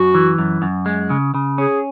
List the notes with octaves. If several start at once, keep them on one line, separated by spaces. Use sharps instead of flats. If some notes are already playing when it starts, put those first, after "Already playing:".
Already playing: F#2 F#4
E3
F#2
F#2
G#3
C#3
C#3
C#4 G#4